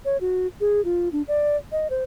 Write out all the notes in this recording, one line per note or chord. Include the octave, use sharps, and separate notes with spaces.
C#5
F#4
G#4
F4
D4
D5
D#5
C5